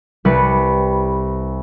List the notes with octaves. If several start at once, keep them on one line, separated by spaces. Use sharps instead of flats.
C2 G3 B4 C#7